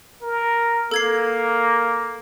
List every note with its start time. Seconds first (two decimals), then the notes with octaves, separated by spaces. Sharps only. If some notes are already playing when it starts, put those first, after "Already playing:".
0.22 A#4
0.91 A#3 A4 G#6 C7